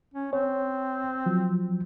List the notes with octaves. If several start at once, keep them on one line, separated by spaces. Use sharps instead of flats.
C#4
C4 C#5
F3 F#3